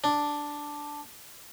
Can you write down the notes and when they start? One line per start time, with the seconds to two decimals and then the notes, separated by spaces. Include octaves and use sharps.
0.04 D4